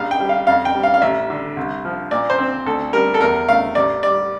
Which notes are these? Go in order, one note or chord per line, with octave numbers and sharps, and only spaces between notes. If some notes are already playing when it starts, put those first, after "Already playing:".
Already playing: A#1 G3 F5
G5
G3
F5
F2 F5
G5
G3
F5
F5
A1 E5
D3
C2
F3
A#2 D5
C5
C4
D2 A4
G3 A#4
A4
E2 A#4
A3 F5
A1 D5
G3 D5